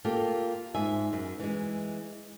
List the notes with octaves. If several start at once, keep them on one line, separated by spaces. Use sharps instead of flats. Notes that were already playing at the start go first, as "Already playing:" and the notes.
A#3 F4 G4 A4
G#2 E5 G#5
F#2
E3 G#3